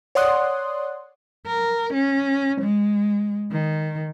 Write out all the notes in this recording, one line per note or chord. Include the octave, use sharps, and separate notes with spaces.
C#5 D5 F#5 C6 D#6 F#6
A#4
C#4
G#3
D#3